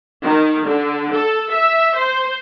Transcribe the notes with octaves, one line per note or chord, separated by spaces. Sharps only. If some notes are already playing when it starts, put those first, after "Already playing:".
D#3
D3
A4
E5
C5